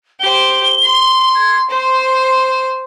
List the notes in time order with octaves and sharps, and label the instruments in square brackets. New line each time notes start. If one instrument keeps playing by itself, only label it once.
[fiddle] G4 C5 [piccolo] G7
[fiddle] C6
[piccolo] G#6
[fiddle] C5 [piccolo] C6